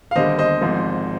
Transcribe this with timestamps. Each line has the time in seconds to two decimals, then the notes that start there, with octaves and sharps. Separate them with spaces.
0.11 F5
0.16 D#2 D3 G3 C5 D#5
0.38 C5 D#5
0.61 G#1 G#2 F3